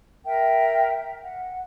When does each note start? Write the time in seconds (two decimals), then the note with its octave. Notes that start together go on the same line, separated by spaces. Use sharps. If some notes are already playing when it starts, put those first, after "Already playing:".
0.25 A#4 E5 G5
1.23 F#5